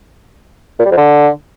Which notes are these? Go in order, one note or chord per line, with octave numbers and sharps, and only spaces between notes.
A#2
G3
F2
D3